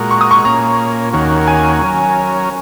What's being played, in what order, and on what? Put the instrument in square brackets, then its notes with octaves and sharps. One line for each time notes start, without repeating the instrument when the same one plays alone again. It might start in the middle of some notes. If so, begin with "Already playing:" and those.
Already playing: [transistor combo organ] A#2 G#3 F#4 A#4
[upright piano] C#6
D#6
C#6
[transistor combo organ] A#2 A#3 C#4 [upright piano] A#5
[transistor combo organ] D#2 D#3 A#3 C#4 F#4
[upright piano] G#5
[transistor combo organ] F#3 C#4 A#4